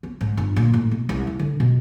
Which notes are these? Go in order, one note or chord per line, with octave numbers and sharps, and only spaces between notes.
B3
G#2
G1
A#2
A1
B2
C2
E4
D3
B2